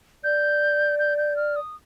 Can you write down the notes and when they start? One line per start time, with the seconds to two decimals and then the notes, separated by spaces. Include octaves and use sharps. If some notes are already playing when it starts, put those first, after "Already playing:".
0.24 D5 G6
0.99 G6
1.18 G6
1.36 F6
1.56 D#6